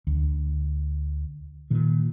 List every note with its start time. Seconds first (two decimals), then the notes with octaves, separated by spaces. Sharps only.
0.07 D2
1.70 A#2 D#3